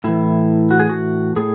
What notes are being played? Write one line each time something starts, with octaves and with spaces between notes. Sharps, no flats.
A2 E3 E4
F#4
G#4
F#4
A2 G#4